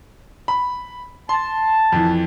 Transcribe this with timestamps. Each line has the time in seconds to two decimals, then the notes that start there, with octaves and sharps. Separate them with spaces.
0.48 B5
1.29 A5 C6
1.92 F2 E3